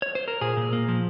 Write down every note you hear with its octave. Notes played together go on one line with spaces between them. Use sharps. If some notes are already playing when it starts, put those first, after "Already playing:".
C#5
C5
A#4
A#2 G#4
A#2
A#3
F3